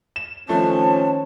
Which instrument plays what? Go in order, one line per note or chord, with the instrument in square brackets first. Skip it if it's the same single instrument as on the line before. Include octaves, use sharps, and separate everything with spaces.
[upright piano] E7
[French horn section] D#3 C4 C#4 [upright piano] F3 A3 [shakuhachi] A5